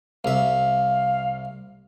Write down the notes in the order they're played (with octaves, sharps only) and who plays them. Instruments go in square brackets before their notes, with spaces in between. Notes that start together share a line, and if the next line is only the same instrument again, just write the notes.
[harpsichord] C2 E5 [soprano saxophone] F5